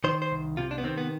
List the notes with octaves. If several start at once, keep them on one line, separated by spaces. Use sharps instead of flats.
D#3 C5
C5
C2
C3 F4
D4
B3
D#3 C4
B3